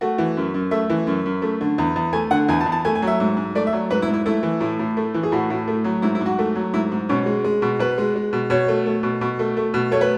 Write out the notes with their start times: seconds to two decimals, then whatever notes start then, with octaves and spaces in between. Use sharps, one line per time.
0.01 A3 F#4
0.18 E3
0.37 F#2
0.54 F#2
0.71 A3 E5
0.90 E3
1.07 F#2
1.26 F#2
1.42 A3
1.61 D3
1.78 E2
1.96 E2
2.13 A3 G#5
2.31 D3 F#5
2.48 E2 G#5
2.61 A5
2.66 E2
2.72 A5
2.85 A3 G#5
2.95 G#5
3.02 F#3 E5
3.20 G#2
3.37 G#2
3.55 A3 D5
3.67 E5
3.73 F#3
3.90 G#2 B4
4.02 E4
4.08 G#2
4.14 E4
4.26 A3 E4
4.43 E3
4.61 A2
4.79 A2
4.97 A3
5.14 E3
5.23 G#4
5.32 A2 F#4
5.50 A2
5.68 A3
5.84 F#3
6.02 G#2 E4
6.15 E4
6.21 G#2 F#4
6.39 A3
6.56 F#3
6.74 G#2 E4
6.92 G#2
7.09 B2 C#4
7.26 G#3
7.44 G#3
7.62 B2
7.79 B2 B4
7.98 G#3
8.16 G#3
8.33 B2
8.50 B2 C#5
8.68 A3
8.86 A3
9.03 B2
9.21 B2
9.39 A3
9.57 A3
9.74 B2
9.92 A3 C#5
10.01 B4